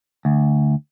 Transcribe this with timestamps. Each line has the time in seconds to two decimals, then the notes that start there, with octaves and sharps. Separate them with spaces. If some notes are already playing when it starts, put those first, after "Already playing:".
0.25 D2